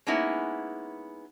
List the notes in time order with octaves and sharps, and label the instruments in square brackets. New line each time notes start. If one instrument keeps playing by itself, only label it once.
[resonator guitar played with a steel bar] G#3 A#3 B3 C#4 D#4 E4